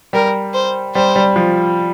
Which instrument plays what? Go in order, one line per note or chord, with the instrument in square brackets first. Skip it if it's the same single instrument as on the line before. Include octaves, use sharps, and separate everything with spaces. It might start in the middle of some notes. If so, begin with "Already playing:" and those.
[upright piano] G3 [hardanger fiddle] A#4
[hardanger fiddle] C5
[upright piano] G3 [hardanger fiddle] C5
[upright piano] G3
F3